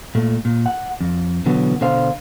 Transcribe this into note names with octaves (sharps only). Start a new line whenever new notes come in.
A#2 A3
A#2
F#5
F2
B2 D3 E3 F#3 B3
B2 D3 C5 F5